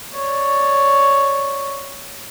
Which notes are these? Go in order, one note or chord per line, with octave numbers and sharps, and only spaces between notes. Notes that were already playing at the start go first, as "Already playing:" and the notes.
C#5 D5